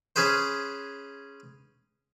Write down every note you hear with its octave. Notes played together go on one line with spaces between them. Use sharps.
C#4 G#4 B4 C5